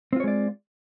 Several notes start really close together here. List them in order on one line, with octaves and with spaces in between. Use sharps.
C4 F4 C#5 G#3 D5